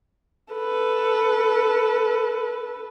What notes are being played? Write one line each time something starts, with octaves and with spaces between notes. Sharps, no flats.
A4 B4